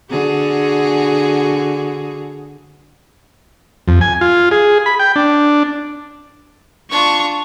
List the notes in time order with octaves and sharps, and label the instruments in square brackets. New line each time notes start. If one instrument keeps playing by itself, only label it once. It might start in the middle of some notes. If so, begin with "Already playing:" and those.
[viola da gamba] D3 F#4 G#4
[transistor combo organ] F2
G#5
F4
G#4
B5
G5
D4
[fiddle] D4 F4 [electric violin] C#6